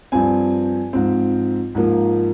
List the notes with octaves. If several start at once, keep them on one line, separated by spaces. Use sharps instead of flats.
G2 F3 C4 G#5
G#2 F3 C4
G#2 F3 A#3